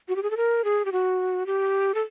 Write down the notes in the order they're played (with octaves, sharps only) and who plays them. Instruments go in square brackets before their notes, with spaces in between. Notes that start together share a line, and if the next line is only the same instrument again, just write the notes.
[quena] F#4
G4
G#4
A4
A#4
G#4
G4
F#4
G4
A4